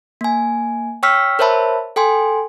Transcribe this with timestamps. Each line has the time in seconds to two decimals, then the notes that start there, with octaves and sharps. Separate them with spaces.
0.21 A#3 G#5
1.03 C#5 G5 C#6 E6 F6 B6
1.39 A#4 C5 C#5 E5 A5 B5
1.96 A4 G5 G#5 C6